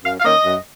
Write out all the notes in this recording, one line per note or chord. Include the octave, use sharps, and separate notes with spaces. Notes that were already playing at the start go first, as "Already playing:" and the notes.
F#2 F5
F5
D#3 A#3 C#4 D#5
F#2